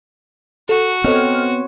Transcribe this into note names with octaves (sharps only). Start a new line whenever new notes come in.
F#4 A4
B3 C4 A4 C#5 D#5 F6